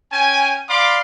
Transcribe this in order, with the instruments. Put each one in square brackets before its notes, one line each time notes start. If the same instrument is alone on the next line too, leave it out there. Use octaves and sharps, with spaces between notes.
[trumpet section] C#4 G5 G#5
D5 F5 B5 C6 D6